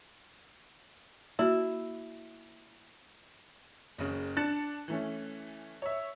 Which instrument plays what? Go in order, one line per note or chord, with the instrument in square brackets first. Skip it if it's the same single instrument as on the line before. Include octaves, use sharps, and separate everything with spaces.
[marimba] A#3 F#4 [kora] E4
[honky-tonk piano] F#1 C#3
D4 F#6 A6 C#7 E7
E3 A3 C#4
C#5 E5